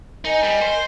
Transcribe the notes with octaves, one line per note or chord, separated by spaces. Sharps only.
D#4 A#4 D#5 G#5
G3
C5